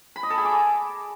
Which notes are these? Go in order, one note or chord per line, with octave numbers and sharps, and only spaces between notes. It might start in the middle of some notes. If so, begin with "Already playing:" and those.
B5
D#5
A4
G#4
D6